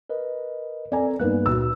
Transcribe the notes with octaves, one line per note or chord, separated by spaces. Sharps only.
A#4 B4 D#5
C4 A4 D5 G#5 A#5
G2 G3 A#3 B3 D#4 F#6
C#2 A#2 F#4 E6